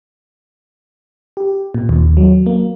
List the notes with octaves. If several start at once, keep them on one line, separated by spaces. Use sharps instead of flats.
G4
A#2
D#2
F#3
A#3